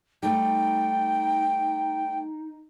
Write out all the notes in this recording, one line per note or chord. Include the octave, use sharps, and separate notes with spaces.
G3 A3 D#4 G5